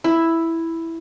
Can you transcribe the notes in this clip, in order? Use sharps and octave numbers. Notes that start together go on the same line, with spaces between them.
E4